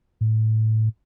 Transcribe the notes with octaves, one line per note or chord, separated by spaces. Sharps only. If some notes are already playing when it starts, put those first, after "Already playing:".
A2